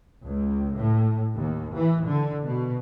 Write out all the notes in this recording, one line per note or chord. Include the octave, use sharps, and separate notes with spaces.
C#2
A2
D#2
E3
D3
B2